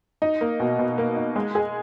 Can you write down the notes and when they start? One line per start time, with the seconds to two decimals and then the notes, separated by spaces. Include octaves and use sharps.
0.22 D#4
0.41 A#3
0.60 B2
0.79 B2
0.98 A#3
1.16 D#4
1.36 G#3
1.55 G#4